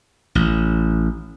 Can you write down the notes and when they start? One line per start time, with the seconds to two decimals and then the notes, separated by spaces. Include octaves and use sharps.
0.35 A1